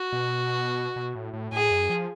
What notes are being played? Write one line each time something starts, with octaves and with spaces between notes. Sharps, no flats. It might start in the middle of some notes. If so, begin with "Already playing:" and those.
Already playing: F#4
B2
B2
A2
A2
A2 G#4
F#2
F3